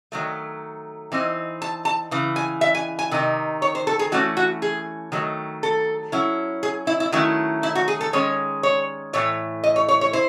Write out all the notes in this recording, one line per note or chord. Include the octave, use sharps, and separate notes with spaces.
D#3 F#3 A3
E3 C4 D#4
A5
A5
C#3 E3
G#5
E5
G#5
G#5
C3 D#3 D#4
C#5
C5
A4
G#4
E3 A3 C#4 F#4
F#4
G#4
D#3 F#3 A3
A4
F#3 C#4 E4
G#4
E4
E4
D#3 F#3 A3 C#4 E4
E4
F#4
G#4
A4
D#3 G#3 C#4 C#5
C#5
A2 E3 A3 C#5
D#5
C#5
C#5
C#5
E4 C5